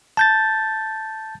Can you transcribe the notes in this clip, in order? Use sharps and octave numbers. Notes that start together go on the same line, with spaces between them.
A5 G6 A6